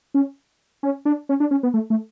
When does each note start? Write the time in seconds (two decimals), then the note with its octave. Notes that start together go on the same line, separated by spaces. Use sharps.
0.14 C#4
0.83 C#4
1.05 D4
1.29 C#4
1.40 D4
1.51 C#4
1.63 B3
1.74 A3
1.90 A3